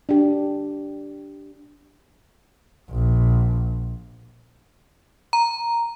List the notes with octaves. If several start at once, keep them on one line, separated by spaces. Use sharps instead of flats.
D4 G4
A#1
A#5